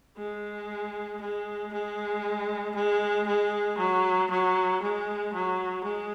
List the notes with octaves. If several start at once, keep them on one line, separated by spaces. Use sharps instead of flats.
G#3
G#3
G#3
G#3
G#3
F#3
F#3
G#3
F#3
G#3